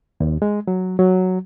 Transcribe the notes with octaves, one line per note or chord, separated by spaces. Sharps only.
D#2
G#3
F#3
F#3